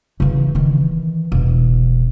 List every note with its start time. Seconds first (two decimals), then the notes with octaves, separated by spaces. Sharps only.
0.20 C#3 E3
0.55 D#3 E3
1.32 E1